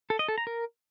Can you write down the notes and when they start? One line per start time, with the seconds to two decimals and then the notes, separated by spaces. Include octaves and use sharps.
0.10 A4
0.19 D#5
0.28 A4
0.38 A#5
0.47 A#4